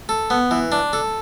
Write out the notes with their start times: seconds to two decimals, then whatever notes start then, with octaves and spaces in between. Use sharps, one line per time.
0.09 A4
0.30 B3
0.51 E3
0.72 D4
0.93 A4